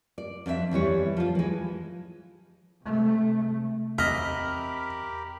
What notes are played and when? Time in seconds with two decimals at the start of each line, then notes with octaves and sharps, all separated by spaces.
0.18 D5
0.46 F2 D4 E4 E5
0.71 E2 E3 G3 C#5
1.17 F3 F4
1.35 E3 G#3
2.83 C3 A3
3.98 E2 C4 G4 A#4 D#5 E5 B5 F6